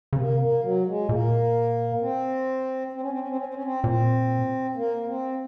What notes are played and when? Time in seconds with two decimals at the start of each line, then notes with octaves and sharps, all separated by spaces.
0.13 C#3
0.17 C3 A#3
0.40 A#3
0.63 F#3
0.87 G#3
1.09 A#2 A#3
2.01 C4
2.93 C4
3.01 C#4
3.11 C4
3.19 C#4
3.28 C4
3.36 C#4
3.46 C4
3.54 C#4
3.64 C4
3.84 A#2 C4
4.76 A#3
5.07 C4